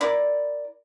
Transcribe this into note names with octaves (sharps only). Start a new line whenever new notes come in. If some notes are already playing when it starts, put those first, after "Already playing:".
E4 A#4 D5